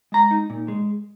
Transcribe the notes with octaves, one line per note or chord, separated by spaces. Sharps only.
G#3 A#5
D#4
A#2
G#3